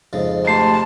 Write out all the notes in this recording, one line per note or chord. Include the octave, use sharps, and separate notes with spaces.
F2 G#2 C#3
A3 G4 A5 C6